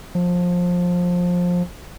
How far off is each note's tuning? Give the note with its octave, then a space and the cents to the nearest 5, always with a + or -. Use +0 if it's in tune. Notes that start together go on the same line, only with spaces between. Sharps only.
F3 +20